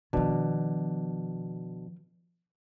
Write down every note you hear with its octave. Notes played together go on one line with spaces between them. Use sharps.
B2 D#3 F3 D4